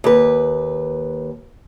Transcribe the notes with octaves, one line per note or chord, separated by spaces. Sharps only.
D#2 B4